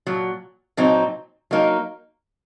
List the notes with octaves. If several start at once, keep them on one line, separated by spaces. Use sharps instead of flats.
A#2 F#3
A#2 F#3 C4 D#4
F#3 A#3 D#4